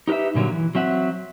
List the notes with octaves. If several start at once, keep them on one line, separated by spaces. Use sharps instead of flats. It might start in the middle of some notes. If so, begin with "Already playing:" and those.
D#4 G4 A#4 B4 E5
G2 A#2 D3 F#3
E3
F#3 C4 E5 F#5